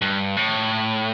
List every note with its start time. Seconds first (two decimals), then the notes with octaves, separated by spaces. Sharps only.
0.01 G2
0.37 A2